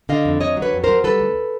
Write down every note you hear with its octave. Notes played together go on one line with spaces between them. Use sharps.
D3 D#5 F5
F2
D3 C#5 D#5
F#3
B4 C#5
F2
F#3 A#4 C5
G3 A4 B4
D2